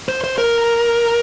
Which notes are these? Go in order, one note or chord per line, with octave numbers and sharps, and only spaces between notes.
C5
C5
A#4